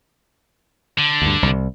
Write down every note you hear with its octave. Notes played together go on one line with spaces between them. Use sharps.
D3
D2 G2
C2